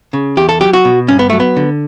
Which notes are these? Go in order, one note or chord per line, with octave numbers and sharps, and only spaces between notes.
C#3
E2 G4
A4
F#3 G4
F#4
B2
G2 C#4
B3
F#3 A3
B3
D3